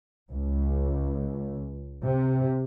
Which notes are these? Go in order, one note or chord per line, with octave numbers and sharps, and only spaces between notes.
C#2
C3